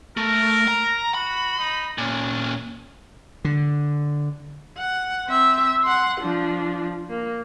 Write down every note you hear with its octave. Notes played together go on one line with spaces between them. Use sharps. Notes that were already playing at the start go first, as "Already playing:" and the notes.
A3 A#4
A#5
F#4 B5
D#4
A#2 C#4 D4
D3
F#5
C4 E5
F#5 C6
F3 D4
A#3